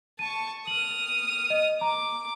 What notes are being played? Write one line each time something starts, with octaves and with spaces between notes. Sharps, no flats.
A5 C#6 D#7
D#6 F6 F#7
D#5
A#5 D6